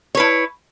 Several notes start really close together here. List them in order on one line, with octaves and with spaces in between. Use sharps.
C#5 B4 E4